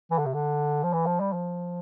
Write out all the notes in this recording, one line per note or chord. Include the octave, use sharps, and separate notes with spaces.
E3
D3
C3
D3
F3
E3
F3
G3
F3